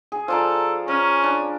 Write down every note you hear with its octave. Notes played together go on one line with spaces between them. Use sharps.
G#4
F3 A4 D5 A#5
C#4 A#4
D4